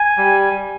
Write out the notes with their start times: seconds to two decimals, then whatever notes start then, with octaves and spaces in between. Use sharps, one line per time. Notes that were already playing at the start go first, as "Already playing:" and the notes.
Already playing: G#5
0.18 G3